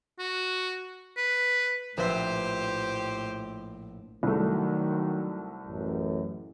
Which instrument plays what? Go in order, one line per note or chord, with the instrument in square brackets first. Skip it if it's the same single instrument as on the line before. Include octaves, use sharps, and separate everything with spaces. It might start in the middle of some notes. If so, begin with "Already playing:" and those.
[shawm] F#4
B4
[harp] A#1 B4 E5 [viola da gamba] A2 [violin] G4 C5
[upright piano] C2 A3 [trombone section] D#3 F#3
[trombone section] A1 F#2